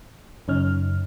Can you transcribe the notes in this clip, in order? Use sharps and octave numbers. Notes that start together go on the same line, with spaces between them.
F#2 C#3 C#4 D#4 F6